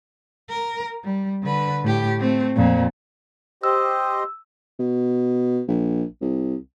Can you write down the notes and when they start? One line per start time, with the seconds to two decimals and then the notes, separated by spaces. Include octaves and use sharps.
0.49 A#4
1.04 G3
1.43 D3 B4
1.83 A2 G4
2.19 A3 C4
2.56 F2 A#2
3.64 G4 C5 D#5 E6
4.79 B2
5.68 A#1
6.21 C2